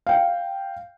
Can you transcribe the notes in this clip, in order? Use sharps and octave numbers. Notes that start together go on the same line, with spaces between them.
F5 G5